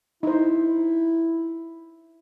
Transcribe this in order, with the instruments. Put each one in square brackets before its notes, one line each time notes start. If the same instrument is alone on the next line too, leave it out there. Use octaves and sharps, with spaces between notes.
[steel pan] D#4 C5 [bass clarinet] E4